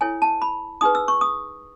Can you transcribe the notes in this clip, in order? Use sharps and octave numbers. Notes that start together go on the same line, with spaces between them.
E4 A4 C#5 G#5
A5
B5
D#4 G#4 B4 D#6
E6
C#6
D#6